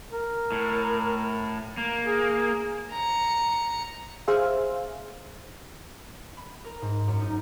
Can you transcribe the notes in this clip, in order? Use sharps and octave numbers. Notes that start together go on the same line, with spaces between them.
A#4
A2
A#3
G#4
A#5 C#7
G#4 C5 E5 F5
B5
A#4
G#2
F#2
D#4